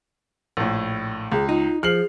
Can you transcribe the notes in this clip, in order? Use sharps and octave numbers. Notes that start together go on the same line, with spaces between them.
A#1 A2
C#2 G#4
D#4 F4
F3 G#4 F6 C7 F#7